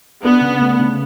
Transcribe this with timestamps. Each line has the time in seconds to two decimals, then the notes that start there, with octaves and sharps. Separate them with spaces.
0.23 B3 D4
0.41 C#3
0.61 A3
0.79 C#3